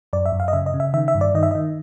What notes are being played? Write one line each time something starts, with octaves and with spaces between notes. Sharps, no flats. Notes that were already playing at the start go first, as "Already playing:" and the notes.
F#2 D5
E5
F#2
F5
D#5
C#3 E5
D#5
C#3
E5
D#3 E5
E5
G2
D5
D#3 D#5
E5
D#5
D#3